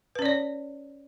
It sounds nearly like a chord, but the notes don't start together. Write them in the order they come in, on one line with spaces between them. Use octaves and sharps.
B4 C#4 D5 C#5